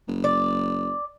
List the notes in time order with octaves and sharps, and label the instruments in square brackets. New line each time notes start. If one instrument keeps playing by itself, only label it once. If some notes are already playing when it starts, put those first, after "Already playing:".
[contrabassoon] F#1
[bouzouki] D5